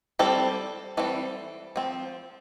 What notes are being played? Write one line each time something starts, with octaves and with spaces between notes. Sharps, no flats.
G3 C4 A4
E3 G3 C4 A4
F3 C4